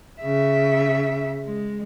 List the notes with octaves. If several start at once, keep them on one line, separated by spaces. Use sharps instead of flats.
C#3 E5
G#3